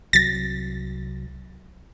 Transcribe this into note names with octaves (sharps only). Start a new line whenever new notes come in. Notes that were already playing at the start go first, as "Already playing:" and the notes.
C2 F#3 A6 A#6